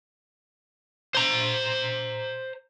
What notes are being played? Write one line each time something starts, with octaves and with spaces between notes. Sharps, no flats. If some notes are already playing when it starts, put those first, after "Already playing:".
C5 A#5